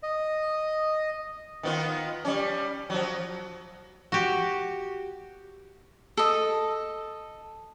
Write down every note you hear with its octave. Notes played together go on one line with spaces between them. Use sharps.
D#5
D#3 B3 F4
G3 C#4
F3 F#3
F#4 G4
A4 D#5